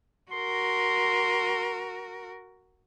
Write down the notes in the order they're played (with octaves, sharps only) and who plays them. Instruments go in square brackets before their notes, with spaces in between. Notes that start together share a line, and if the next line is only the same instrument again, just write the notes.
[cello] F#4 A#4 [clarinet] C6